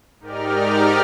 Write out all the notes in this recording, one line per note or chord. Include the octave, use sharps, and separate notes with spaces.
G#2 D#4 G4 A#4 D5 F6